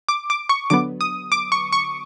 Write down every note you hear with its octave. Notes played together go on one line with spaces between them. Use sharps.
D6
D6
C#6
D3 F#3 B3 D6
D#6
D6
C#6
C#6